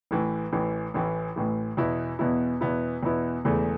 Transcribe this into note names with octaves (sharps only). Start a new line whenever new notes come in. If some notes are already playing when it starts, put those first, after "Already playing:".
A1 A2 E3
A1 A2 E3
A1 A2 E3
A1 A2 E3
E2 B2 B3 E4
E2 B2 B3 E4
E2 B2 B3 E4
E2 B2 B3 E4
E1 E2 C#3 E3 A3